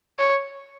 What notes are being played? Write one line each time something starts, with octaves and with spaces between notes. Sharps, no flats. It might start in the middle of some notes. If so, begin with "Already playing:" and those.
C#5